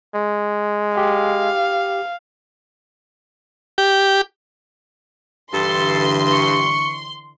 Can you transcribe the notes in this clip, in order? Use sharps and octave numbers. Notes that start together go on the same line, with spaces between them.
G#3
G4 F5
G4
G2 D3 E3 A4 C6
C#6